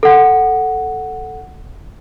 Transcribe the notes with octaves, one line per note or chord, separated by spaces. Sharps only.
A4 F#5